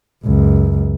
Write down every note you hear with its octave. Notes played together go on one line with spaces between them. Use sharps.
C#2 F#2